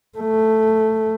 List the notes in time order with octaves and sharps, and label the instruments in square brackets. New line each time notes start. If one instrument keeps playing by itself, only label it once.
[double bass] A3